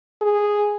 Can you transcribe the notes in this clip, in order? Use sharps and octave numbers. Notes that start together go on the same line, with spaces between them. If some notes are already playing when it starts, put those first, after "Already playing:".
G#4